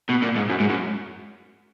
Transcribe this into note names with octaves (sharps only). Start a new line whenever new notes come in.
B2
A#2
G#2
F#2
G#2
F#2